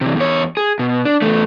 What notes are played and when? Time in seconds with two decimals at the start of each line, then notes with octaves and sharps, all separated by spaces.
0.01 C3 E3
0.16 E2 C#5
0.57 G#4
0.79 B2
1.05 D4
1.22 E2 A3